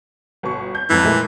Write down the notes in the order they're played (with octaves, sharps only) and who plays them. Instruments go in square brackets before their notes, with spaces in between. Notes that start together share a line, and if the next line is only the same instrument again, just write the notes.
[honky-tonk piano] G1 B2 C#6
G6
[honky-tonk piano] G1 F2 G#2 [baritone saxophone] E3
[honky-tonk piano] A#2 G#3 A3